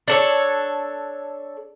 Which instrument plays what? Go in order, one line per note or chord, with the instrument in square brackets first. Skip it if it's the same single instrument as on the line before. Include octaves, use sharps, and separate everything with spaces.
[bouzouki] D4 A4 C#5